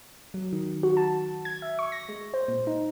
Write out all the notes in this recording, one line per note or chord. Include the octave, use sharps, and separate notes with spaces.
F#3
D#3
F#4
A5
G#6
E5
C#6
A#6
G#3
C5
A#2
D#4